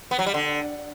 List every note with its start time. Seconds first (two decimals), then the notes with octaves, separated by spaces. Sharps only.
0.11 B3
0.19 F#3
0.26 G3
0.34 D3